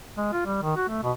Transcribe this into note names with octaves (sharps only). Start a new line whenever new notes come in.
G#3
F4
G3
D#3
F#4
A3
B2